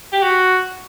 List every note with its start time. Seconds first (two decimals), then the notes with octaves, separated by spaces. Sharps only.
0.13 G4
0.22 F#4